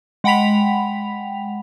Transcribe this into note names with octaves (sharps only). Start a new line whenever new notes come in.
G#3 F#5 G5 B5 B6 F7